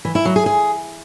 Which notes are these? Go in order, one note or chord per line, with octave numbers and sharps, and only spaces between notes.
E3
E4
F#3
G#4
G#4